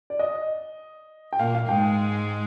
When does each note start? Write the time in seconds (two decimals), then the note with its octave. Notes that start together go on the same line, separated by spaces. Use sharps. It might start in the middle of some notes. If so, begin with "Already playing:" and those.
0.10 D5
0.19 D#5
1.33 G5
1.39 A#2 A#3 F5
1.55 F5
1.69 G#2 G#3 G5